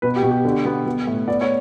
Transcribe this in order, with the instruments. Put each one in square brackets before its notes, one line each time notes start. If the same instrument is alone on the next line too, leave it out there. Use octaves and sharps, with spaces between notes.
[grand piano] B2 B4
G4
B2
G4
D3
B3
B3
A2
B3 D5
C#5